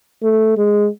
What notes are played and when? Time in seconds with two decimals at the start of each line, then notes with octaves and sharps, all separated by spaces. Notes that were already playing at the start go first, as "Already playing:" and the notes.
0.23 A3
0.58 G#3